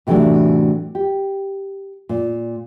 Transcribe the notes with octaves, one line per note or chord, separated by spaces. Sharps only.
A2 C3 E3 F#3 A3 D4
G4
A#2